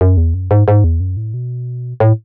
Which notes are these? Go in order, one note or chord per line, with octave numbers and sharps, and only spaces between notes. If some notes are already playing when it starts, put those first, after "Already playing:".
F#2
E2
F#2
G#2
G#2
E2
F#2
A2
B2
A2